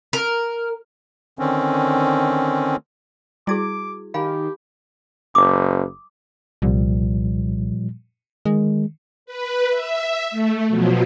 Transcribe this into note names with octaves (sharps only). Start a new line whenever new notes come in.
A#4
D3 D#3 C4 C#4
G3 E4 F#4 G#4 D6 G#6
D#3 G4 F5 G#5 B5
F#1 D6 D#6
C2 A#2 F3 G3
D#3 G#3
B4
E5
A3
B2 F3 F#3